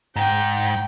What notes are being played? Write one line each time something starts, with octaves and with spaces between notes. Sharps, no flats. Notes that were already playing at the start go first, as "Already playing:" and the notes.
G#2 G5